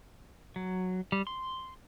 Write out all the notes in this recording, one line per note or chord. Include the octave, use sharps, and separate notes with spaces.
F#3
G3
C6